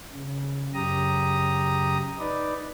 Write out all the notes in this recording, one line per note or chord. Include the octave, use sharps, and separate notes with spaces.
C#3
F#2 C#3 G4 A#5 D#6
D#4 B4 D5